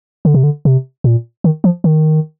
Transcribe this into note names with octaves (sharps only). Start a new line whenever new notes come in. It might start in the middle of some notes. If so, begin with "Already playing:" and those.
D3
C3
D3
C3
A#2
D#3
F3
D#3